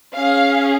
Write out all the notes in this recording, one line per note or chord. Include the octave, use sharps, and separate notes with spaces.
C#4 G#4 F5